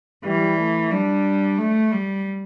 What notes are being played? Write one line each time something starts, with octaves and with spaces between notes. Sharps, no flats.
E3 G3
A3
G3 D4
A3
G3